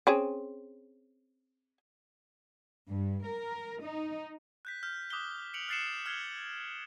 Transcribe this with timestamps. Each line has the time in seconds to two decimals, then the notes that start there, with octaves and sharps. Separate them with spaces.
0.07 C4 C#4 G#4
2.89 G2
3.26 A#4
3.82 D#4
4.65 F#6 G6 B6
4.83 F6 G6
5.10 D6 D#6 F#6 G6 B6 G7
5.54 C#7 D7 F7 F#7
5.68 F6 F#6 A6 C7 C#7 E7
6.06 F6 F#6 G#6 C7 F7 G7